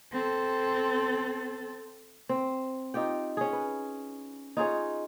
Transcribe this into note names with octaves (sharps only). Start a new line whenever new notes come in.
C4 A4
C4
D#4 F4 G4 G5
C#4 G#4
B4
D#4 F4 G#4 C#5